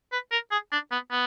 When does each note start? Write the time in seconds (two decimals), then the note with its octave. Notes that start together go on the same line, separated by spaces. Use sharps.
0.12 B4
0.32 A#4
0.51 G#4
0.72 D4
0.92 B3
1.11 B3